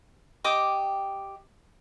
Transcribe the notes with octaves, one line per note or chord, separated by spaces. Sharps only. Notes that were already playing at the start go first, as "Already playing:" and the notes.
G4 D#5 D6